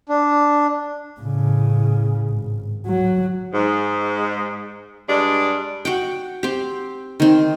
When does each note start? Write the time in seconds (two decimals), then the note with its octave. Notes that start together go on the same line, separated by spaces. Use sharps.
0.09 D4
1.20 A2 C#3
2.29 G#1
2.87 F#3
3.54 G#2
5.09 G2 G#3 D4
5.85 F#4 F#5 G5
6.43 C4 G4
7.20 D#3 C4